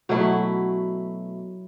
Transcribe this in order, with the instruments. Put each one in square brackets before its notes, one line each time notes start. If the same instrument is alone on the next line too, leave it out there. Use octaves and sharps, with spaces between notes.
[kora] B2 F#3 A3 E4